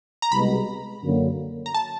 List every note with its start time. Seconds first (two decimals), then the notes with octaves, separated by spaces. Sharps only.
0.22 A#5
0.32 C2 B2 G#3 B5
1.03 F#2 D3 F#3 A#3
1.66 A#5
1.75 A5